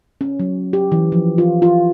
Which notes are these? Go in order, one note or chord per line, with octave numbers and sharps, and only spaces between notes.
C#4
F#3
G4
E3
F3
F4
F4